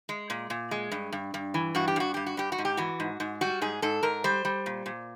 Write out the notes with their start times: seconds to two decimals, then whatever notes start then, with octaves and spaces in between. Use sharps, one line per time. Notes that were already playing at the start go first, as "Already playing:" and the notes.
0.09 G#3
0.30 A#2
0.50 A#2
0.71 G#3
0.91 G2
1.12 G2
1.34 G2
1.54 E3
1.75 G2 F#4
1.88 G4
1.96 G2 F#4
2.14 G2 G4
2.26 F#4
2.37 G2 G4
2.52 F#4
2.58 G#2
2.65 G4
2.77 E3 F#4
3.00 G#2
3.20 G#2
3.41 G3 F#4
3.62 G#2 G#4
3.82 G#2 A4
4.03 G#2 A#4
4.24 G3 C5
4.45 G3
4.66 A#2
4.86 A#2